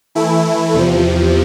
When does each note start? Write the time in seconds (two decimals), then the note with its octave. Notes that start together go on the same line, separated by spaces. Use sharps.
0.15 E3 A3 E4
0.73 E2 C3 F3